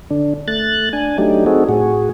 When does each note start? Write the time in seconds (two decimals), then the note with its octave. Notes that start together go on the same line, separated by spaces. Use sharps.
0.10 D3 D4
0.48 A3 F#6 A6
0.93 D4 G#5
1.18 F#3 A3 D4 D#4 G4
1.46 C4 D#4 F#4 G#4 A4
1.69 A2 F#4 G#4